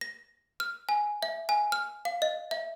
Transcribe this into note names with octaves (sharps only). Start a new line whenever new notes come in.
A#6
F6
G#5
E5
G#5
F6
F5
D#5
E5